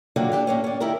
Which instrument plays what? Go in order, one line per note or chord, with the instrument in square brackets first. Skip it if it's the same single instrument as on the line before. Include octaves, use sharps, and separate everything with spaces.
[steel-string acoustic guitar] D3 D#3 F#3 A#3 F4 F#4
D4 G4 D5
A2 A#3 C#4
C#4 D5
D#3 E4 G4 A#4